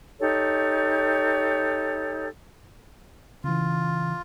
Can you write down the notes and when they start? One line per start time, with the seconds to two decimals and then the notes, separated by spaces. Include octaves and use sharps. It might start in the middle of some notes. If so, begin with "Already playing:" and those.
0.20 D#4 G4 A4 C#5
3.44 C#3 E3 F4